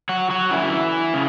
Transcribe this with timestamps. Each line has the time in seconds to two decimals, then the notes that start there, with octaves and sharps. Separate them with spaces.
0.09 F#3 F#4
0.30 F#3 F#4
0.51 F#2 D3 E3 E4
1.14 C#3